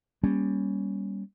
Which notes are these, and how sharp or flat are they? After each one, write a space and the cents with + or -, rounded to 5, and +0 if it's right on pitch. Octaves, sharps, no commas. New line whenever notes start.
G3 +10 A#3 +35 C#4 +0